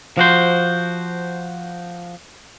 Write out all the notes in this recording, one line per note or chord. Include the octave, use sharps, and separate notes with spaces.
F3 F#4 C5